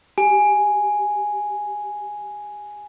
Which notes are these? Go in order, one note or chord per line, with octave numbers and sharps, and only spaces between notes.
G4 G#5